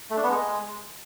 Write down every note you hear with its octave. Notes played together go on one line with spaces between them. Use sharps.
A3
D4
B3
G#3